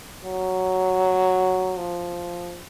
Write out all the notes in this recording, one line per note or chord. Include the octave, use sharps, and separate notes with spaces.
F#3
F3